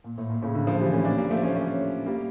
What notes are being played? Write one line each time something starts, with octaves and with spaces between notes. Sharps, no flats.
A#2
A2
A#2
A2 C#3
A#2 D3
D3 F3
E3 G3
A3 C#4
A#3 D4
G3 A#3
F3 A3
A3 C#4
A3 C#4
G3 A#3